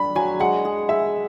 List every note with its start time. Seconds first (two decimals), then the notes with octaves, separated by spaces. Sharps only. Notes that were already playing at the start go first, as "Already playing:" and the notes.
Already playing: D4 B5
0.15 F#3 G#5
0.40 G#3 F#5
0.65 G#4
0.89 G#4 E5